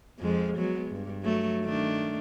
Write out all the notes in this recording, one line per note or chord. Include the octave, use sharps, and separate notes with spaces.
F2 F3 G#3
F#3 G#3 B3
G2
F#3 A3
D#3 A3 D4